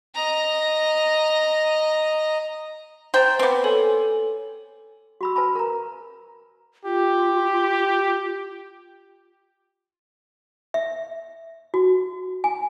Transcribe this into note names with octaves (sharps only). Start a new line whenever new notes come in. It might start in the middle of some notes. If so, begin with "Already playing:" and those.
D#5 A#5
C5 G5 A#5 C6 A6
B3 C4 B4 C6 D6
A4 C#5 G#5
F#4 B5 E6
B4 G#5 A5 B5
A#4 A#5
F4 G4
E5
F#4
G#5